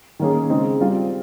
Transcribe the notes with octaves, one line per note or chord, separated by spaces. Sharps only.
D#3 A#3 C#4 G#4
C#3 G#3 C4 D#4
G3 C4 F4